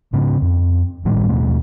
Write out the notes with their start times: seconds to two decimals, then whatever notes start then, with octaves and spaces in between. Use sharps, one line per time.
0.13 G#2 C#3 C4
0.42 F2
1.04 G#1 A2 D#3 G3
1.29 D#2 B2 A3